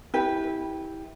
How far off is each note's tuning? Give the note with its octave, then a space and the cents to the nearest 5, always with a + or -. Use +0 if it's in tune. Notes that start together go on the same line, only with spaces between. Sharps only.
E4 -25 G4 +0 B4 -15